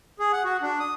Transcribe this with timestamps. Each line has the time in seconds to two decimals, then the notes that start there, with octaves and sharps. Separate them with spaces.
0.19 G#4
0.33 F#5
0.45 F#4
0.62 D4
0.80 D#6